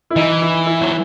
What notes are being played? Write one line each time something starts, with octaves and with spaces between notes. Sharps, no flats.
E4
E3 D#4
E4
E4
F#3